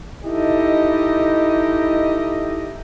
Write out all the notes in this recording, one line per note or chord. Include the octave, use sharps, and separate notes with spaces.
D#4 E4 G4 A4 D#5